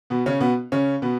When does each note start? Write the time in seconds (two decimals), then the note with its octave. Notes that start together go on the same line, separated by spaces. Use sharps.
0.10 B2 B3
0.26 C#3 C#4
0.40 B2 B3
0.72 C#3 C#4
1.02 B2 B3